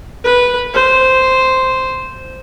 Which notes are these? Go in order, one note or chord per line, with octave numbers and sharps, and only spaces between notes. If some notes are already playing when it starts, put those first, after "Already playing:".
B4
C5